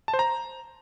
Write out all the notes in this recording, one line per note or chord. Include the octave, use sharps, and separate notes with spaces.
A5
C5
A#5